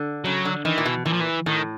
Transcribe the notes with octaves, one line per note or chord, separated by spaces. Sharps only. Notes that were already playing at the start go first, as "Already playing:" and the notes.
Already playing: D3
C#3 F#3
D3
D#3 E3
A#2
B2
A#2 E3
F3
E3
A2 D#3